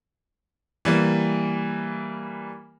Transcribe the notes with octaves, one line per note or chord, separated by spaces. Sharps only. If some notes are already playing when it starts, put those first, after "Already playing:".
E3 G3 A#3